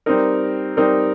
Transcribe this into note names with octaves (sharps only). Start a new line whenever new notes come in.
G3 C4 D#4 A#4
G3 C4 D#4 A#4